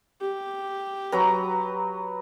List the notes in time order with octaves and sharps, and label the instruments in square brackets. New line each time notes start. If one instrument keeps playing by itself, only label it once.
[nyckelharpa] G4
[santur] F#3 B4 A#5